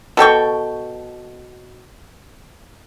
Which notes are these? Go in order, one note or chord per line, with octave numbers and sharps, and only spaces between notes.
B2 A4 G5 C#6